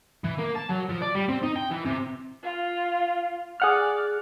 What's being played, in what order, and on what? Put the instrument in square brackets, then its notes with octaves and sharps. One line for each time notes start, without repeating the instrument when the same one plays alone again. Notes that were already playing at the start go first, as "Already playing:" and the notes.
[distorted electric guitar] E3
A#3
A5
F#3
F3
D5
G3
C4
D#4
G5
E3
C3
[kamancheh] F4
[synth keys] G#4 F#5 F6 [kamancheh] D5